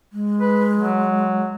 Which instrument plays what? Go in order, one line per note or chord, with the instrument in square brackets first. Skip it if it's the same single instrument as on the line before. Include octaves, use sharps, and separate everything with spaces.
[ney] G#3
[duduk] B4
F#3